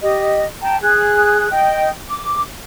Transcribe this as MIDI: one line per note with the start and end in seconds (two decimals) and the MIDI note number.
0.02 0.45 67
0.02 0.45 75
0.62 0.77 79
0.62 0.77 81
0.62 0.77 82
0.82 1.50 68
0.82 1.50 90
1.50 1.89 75
1.50 1.89 79
2.09 2.42 86